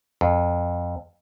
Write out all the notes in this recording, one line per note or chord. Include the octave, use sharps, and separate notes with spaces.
F2